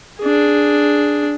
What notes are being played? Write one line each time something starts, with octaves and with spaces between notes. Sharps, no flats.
D4 G#4